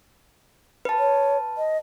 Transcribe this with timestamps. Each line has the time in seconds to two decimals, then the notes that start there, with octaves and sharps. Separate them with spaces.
0.85 B4 A5
0.99 C#5
1.57 D#5